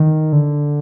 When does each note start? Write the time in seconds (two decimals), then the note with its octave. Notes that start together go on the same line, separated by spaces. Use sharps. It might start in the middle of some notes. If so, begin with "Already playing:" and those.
Already playing: D#3
0.33 D3